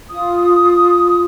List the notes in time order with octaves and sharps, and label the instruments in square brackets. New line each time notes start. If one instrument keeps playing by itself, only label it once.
[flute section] F4 D#6